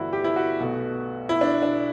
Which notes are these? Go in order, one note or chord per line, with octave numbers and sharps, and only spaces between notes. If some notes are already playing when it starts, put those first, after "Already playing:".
Already playing: G1 G2 E3 A3 E4 F#4
G4
E4
F#4
B1 B2 A3
E4
D4
D4